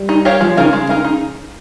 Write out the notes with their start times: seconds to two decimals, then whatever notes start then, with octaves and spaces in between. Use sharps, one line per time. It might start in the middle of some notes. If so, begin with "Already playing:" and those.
Already playing: G3
0.09 D#4
0.25 G4 A#4 C#5 F5
0.41 F3 G#3
0.57 C#3 D#4 A#4 F5
0.73 G#3
0.89 D#4 A#4 F5
1.04 D#4